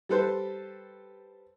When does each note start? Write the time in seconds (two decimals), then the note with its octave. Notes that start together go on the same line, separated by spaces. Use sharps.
0.09 G3 G4 A4 B4 C5